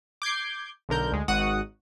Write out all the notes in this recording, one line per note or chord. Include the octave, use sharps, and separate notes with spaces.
D6 G6 G#6 C7
B1 D3 A#4 G6
D2 G#3
G#1 G#2 F#4 F#5 D#6